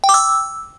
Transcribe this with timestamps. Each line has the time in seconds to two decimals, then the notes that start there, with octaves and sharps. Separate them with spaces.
0.04 G5
0.09 D6
0.14 E6